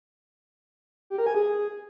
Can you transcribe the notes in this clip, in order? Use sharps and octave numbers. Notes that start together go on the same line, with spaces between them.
G4
A#4
G#5
G#4